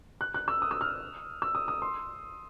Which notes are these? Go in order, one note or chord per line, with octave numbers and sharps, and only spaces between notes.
F#6
F#6
E6
D#6
E6
F6
E6
D#6
D#6
C6